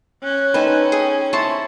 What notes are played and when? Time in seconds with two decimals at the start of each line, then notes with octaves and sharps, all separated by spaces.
0.24 C#4 F#6
0.54 D#4 A4 B4 C5 G5 G#5
0.92 G#4
1.33 E4 C5 C#5 A5 A6